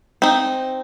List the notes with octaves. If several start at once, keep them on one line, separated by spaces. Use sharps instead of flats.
C4 D#4